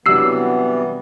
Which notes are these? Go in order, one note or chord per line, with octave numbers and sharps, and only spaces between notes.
C3 E3 F#3 G3 B3 D4 E6 C7